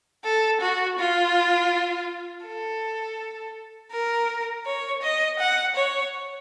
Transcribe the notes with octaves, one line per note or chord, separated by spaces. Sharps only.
A4
F#4
F4
A4
A#4
C#5
D#5
F#5
C#5